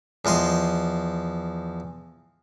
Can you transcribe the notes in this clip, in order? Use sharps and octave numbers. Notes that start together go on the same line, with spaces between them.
E2 F3 D#5 C6